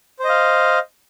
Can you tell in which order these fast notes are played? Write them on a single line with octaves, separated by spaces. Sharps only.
C5 D#5 F5